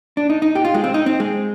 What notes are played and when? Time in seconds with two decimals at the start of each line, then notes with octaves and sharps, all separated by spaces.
0.17 D4
0.30 D#4
0.42 D#4
0.55 G4
0.65 F4
0.74 G#3
0.84 C4
0.94 D#4
1.06 C4
1.20 G#3